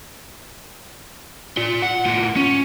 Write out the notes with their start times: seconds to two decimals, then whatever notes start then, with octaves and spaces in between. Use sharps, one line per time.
1.57 F4 D5
1.82 F#5
2.06 A2 F4
2.36 C#4